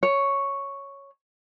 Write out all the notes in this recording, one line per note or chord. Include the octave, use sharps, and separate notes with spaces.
C#5